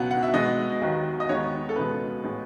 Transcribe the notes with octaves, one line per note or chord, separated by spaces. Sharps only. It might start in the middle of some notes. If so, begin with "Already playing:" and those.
Already playing: C#2 B2 F#3 B3 F#5
F#5
E5
B2 G#3 B3 D#5
D#2 D#3 F#3 B3
D#5
D#2 D#3 G#3 B3 C#5
A4
C#2 B2 G#3 B3 B4
A2 G#3 B3